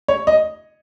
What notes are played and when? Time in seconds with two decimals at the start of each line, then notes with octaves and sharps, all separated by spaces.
0.08 C#5
0.27 D#5